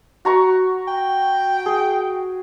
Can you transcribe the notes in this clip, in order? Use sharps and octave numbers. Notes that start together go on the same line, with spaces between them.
F#4 A#5 C#6
G5
G#4